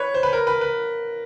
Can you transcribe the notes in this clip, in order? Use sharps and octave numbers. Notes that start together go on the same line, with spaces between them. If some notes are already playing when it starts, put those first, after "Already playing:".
Already playing: B4 C#5
C5
B4
A#4
B4
B4